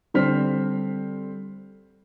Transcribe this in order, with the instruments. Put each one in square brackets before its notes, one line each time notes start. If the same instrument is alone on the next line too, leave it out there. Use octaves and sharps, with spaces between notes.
[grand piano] D3 G3 C4 C5 F6 B6